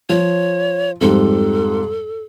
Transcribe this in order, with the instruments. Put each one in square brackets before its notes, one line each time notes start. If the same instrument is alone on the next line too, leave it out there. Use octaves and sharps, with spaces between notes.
[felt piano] F3 [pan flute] C#5
[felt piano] F2 G#2 G3 [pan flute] A4